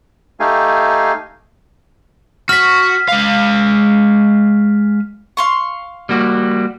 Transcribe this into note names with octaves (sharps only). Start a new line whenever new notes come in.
A3 D#4 G4 F5 G#5
F#4 F6 B6
G#3 F5
F5 C6 C#6
G3 A#3 F#4